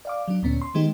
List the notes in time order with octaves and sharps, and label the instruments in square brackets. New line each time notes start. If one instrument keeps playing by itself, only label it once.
[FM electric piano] D5 F5 D6
F#3 D4
D2 A#2 B3 C#4
C6
D#3 G#3 B3 D#4 G4